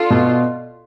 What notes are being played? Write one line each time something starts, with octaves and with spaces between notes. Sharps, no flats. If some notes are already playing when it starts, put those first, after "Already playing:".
Already playing: D4 F4 A4
B2